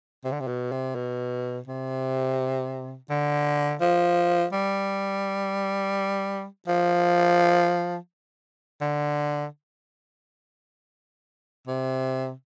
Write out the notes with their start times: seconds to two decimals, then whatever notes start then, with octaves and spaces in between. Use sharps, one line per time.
0.24 C3
0.32 D3
0.40 C3
0.47 B2
0.72 C3
0.95 B2
1.67 C3
3.10 D3
3.81 F3
4.53 G3
6.68 F3
8.81 D3
11.67 C3